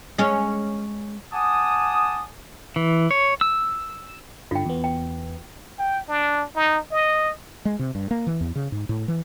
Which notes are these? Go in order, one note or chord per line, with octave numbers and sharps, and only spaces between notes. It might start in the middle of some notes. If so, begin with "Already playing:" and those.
G#3 C#4
F#5 G#5 A5 D6 D#6
E3
C#5
E6
G1 D3 F4 G5
E2 B3
G5
G5
D4
D#4
D#5
G#3
C3
G2
A#3
E3
E2
C#3
G#2
A2
E3